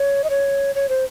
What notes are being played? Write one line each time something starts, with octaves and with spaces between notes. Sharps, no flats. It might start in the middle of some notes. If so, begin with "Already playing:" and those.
Already playing: C#5
D#5
C#5
C#5
C5